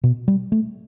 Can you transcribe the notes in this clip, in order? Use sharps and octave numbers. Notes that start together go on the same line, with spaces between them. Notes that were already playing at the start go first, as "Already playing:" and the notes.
B2
G3
A3